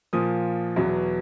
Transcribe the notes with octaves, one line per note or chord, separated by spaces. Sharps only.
A#2 F3 D#6
E2 B2 F#3